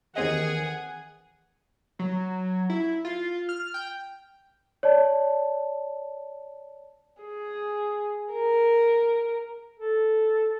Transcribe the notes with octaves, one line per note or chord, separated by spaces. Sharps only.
D#2 D#3 E3 C4 G#4 D#5 F#5
F#3
E4
F4
F6
G5
C#5 D5 A5
G#4
A#4
A4